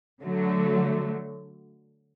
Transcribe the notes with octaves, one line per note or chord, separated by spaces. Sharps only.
D3 F#3 A3